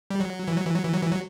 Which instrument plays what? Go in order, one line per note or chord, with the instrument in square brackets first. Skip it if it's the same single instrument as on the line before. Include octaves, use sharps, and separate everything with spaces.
[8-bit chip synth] G3
F#3
E3
F#3
E3
F#3
E3
F#3
E3
F#3